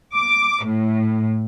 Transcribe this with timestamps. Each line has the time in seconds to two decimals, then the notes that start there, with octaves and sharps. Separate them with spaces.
0.16 D6
0.66 A2